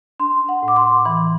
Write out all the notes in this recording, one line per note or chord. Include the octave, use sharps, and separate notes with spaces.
D4 C6
F#5
A2
D6
C6
E3 B5